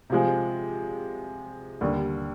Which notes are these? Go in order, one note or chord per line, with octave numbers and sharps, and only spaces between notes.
C3 F3 G#3
D#2 D3 G3